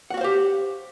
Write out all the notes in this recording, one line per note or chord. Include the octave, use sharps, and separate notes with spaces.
F#4 G4 C5 F5 F#5